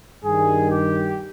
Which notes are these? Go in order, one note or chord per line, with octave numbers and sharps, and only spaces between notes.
G2 D#3 G3 G#4
G4